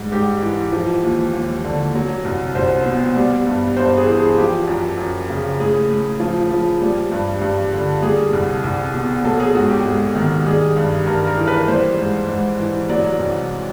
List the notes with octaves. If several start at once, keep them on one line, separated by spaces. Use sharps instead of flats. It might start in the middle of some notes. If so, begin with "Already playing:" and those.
Already playing: G#2 G3
G#2 G4
E3
F3
D#2
D#2
D3
F#3
C2
C2 C5
B2
G3
G2
G2 C5
G#4
E3
G#4
F3 G4
F#2
F#2
C#3
A2 G#4
A2
F3
F3
G3
G2
G2
D3
G3 G#4
C2
C2
B2
F#3 A4
G#4
G#2 F#4
G4
G#2
D#3
G3 G#4
G2
G2 A#4
A#4
E3
B4
G3 C5
G#2
G#2
E3
F#3 D5
C2